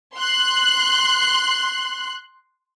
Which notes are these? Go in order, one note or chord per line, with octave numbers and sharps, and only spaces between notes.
C6 F#6